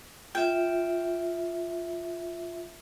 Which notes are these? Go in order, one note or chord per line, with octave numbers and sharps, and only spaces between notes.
F4 E5 G5